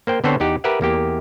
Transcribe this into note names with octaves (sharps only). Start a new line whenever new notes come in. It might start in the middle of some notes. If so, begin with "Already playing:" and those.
A#3 C5 G5
D3 B3 C4 A4 C5 C#5
E2 D#4 G4 F#5
G4 A#4 B4 E5 F#5
E2 A#3 G4